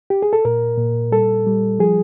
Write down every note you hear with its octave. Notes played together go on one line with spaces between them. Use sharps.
G4
G#4
A4
A#2 A#4
A#2
G3 A4
G3
F3 G#4